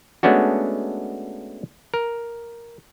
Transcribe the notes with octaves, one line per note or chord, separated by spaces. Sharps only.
G#3 A3 B3 C#4 D4 F#4
A#4